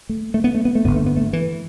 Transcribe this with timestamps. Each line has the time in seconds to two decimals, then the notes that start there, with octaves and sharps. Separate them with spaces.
0.09 A3
0.34 A3
0.44 B3
0.54 A3
0.65 B3
0.75 A3
0.85 G1 G2 D3 B3
0.96 A3
1.06 B3
1.17 A3
1.33 E3